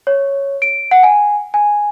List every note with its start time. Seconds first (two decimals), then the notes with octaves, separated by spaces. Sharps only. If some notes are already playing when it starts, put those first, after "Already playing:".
0.07 C#5
0.62 D7
0.91 F#5
1.03 G#5
1.54 G#5